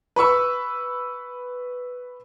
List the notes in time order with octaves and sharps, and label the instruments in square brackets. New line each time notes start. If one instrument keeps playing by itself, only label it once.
[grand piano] B4 B5 C#6 E6